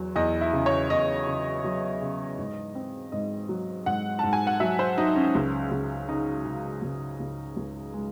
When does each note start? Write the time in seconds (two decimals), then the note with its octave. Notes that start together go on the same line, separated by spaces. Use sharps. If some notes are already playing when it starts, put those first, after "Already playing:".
Already playing: E2 F#3
0.16 E2 D#5
0.41 E4
0.53 C#3
0.66 C#5
0.90 E2 D#5
1.27 C#3
1.64 F#3
2.02 C#3
2.38 G#2
2.75 C4
3.12 G#2 D#5
3.49 F#3
3.86 G#2 F#5
4.19 G#2 A5
4.33 G#5
4.47 F#5
4.60 F#3 E5
4.79 C5
4.98 F#3 D#4
5.16 C#4
5.35 C#2
5.71 C#2
6.08 C#3 D#4
6.45 C#3
6.82 C#2
7.20 C#2
7.57 C#2
7.94 G#3